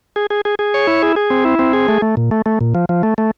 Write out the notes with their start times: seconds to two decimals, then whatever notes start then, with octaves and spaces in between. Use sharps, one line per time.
0.16 G#4
0.30 G#4
0.45 G#4
0.59 G#4
0.74 C#5
0.87 E4
1.02 G#4
1.16 G#4
1.30 C4
1.45 E4
1.59 C4
1.73 G#4
1.88 A3
2.02 A3
2.17 A#2
2.31 A3
2.46 A3
2.61 A#2
2.75 F3
2.89 F3
3.03 A3
3.18 A3